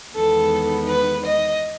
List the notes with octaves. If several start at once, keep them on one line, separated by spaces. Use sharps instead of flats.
E2 D#3 G#3 B3 A4
B4
D#5